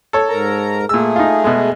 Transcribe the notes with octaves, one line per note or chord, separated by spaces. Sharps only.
A4 C#5
G#2 A#4 A#5
A#2 A3 G#4 E6
D#4 F4
B2 G#3